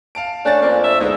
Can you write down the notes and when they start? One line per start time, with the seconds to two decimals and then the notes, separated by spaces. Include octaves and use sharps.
0.15 F5 A5 D7
0.45 A3 C#4 D4 D5 A6
0.62 F2 A#3
0.84 E5
1.01 D3 G#3 B3 D#4